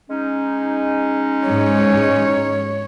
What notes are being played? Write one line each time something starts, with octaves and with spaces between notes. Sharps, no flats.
G#3 C#4 D#4
G#2 C#5